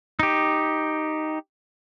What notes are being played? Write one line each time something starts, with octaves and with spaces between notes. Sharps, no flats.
D#4 G4